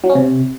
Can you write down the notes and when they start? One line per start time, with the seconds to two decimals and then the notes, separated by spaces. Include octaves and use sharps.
0.04 F#3
0.09 C#4
0.15 C3